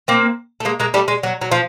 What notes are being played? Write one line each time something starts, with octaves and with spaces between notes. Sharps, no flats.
A#3 C4
A3
G#3 A#3
G#3 A#3
G3 A3
G#3
F#3
F#3
F3